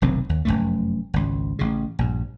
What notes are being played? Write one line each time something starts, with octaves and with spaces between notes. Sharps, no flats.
F1 B1 D#3 C4
D#2
F1 C#2 F#2 A3
G#1 C#2
A1 C#3
A#1 G2